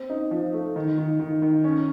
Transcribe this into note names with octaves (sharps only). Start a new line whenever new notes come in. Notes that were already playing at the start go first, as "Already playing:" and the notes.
Already playing: C4
D#4
F3
A3
D#3
D#3
D#3
D#3
C#4